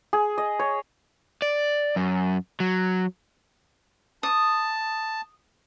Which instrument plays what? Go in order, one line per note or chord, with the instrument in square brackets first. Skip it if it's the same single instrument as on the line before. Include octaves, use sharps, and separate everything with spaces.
[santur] G#4
D#5
C#5
[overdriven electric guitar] D5
F#2
F#3
[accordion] A5 [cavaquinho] D#6